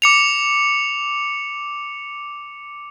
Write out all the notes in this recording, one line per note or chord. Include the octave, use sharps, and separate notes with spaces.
D6 C#7 F7